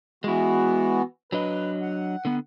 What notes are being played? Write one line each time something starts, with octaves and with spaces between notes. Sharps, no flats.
E3 G#3 B3 E4 F#4
F#3 D4 B4 D#5
F#5
D3 B3